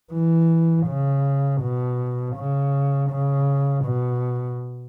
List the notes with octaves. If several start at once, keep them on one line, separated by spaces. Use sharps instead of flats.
E3
C#3
B2
C#3
C#3
B2